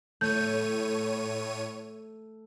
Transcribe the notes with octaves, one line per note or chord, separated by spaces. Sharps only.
A2 A3 C#5 G6 D#7